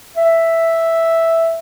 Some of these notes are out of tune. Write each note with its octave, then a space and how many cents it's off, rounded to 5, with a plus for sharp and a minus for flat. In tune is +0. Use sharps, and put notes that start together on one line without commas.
E5 +0